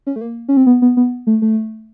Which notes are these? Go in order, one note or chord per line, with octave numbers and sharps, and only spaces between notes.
C#4
A3
A#3
C#4
C4
B3
B3
B3
A3
A3